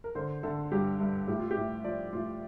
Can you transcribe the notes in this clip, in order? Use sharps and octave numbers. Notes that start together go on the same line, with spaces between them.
A#4
D3 C5
D3 A4
G2 G4
G2
A2 G4
F4
G4
A2
F3 D5
A2 F4